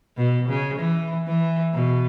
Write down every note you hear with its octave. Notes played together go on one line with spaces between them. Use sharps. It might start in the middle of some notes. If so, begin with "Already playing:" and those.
B2
C#3
E3
E3
B2